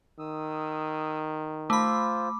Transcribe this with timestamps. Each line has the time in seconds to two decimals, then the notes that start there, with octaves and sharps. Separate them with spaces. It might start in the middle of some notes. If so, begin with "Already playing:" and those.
0.19 D#3 D#6 E6
1.70 A3 F4 C5 B5 D6